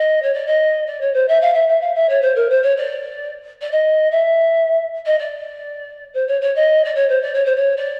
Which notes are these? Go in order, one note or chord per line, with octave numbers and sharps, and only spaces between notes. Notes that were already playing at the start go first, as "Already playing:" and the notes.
Already playing: D#5
C#5
D5
D#5
D5
C#5
C5
E5
F5
E5
E5
F5
E5
C#5
C5
A#4
C5
C#5
D5
D5
D#5
E5
D#5
D5
C5
C#5
C#5
D#5
D5
C#5
C5
D5
C#5
C5
C#5
D5